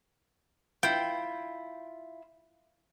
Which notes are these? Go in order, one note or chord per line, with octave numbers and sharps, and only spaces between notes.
E4 F4 G5